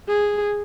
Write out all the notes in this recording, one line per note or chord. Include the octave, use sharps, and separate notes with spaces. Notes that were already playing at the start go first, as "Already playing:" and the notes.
G#4